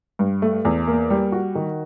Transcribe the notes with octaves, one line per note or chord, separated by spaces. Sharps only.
G2
A3
E2
A#3
G3
F#4
D#3